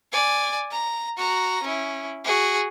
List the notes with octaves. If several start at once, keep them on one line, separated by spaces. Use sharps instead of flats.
D5 G#5
A#5
F#4 A#5
C#4 E4
F#4 G#4